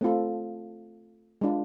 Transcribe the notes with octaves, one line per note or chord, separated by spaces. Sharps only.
A3 C4 F4 A4
G#3 D4 F4